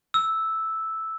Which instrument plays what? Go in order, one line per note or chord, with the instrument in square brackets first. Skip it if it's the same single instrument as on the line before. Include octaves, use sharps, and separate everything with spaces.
[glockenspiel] E6